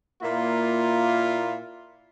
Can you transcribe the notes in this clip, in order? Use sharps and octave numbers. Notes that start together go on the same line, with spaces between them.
A#2 A#3 E4 F4